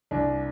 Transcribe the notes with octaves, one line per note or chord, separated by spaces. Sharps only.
C2 D4